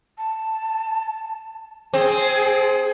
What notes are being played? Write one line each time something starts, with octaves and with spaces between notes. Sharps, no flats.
A5
C4 G#4